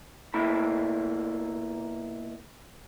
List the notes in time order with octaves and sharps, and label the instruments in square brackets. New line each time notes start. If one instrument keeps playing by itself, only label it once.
[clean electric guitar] B2 A#3 E4 B5